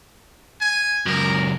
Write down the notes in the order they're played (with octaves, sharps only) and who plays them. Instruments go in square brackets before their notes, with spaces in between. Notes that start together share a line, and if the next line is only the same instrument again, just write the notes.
[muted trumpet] G#5
[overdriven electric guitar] C#2 F#2 [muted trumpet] A#4